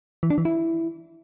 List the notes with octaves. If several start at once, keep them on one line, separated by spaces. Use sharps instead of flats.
E3
D4
E3
E4